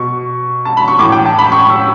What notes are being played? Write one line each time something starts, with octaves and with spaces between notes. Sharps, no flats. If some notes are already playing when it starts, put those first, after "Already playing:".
Already playing: B2 C#6
A5
B5
C#6
A2 E3 D6
G5
A5
B5
C#6
E6